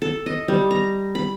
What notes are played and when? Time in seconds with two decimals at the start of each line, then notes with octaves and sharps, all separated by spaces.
0.02 A4
0.26 D#5
0.48 G3
0.71 A#5
1.15 B5